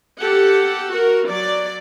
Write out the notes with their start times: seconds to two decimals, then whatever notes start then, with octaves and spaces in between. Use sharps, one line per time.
0.18 G4 A4 F#5
0.92 F#4 A#4
1.28 F#3 D5